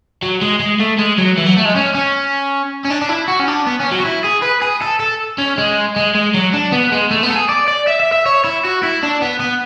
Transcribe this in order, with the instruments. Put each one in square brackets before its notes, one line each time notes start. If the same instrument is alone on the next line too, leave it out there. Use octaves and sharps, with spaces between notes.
[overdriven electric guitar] F#3
G#3
G#3
A3
G#3
F#3
E3
F#3
A3
G#3
C#4
C#4
C#4
D4
D4
E4
F#4
C#4
D4
B3
C#4
F#3
F#4
E4
G#4
B4
G#4
A4
A4
C#4
G#3
G#3
G#3
F#3
D4
B3
G#3
A3
B3
A4
G#4
D5
D5
E5
E5
E5
C#5
E4
F#4
E4
D4
B3
B3